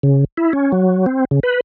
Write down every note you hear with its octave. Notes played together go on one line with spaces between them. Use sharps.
C#3
E4
C#4
F#3
C4
C#3
B4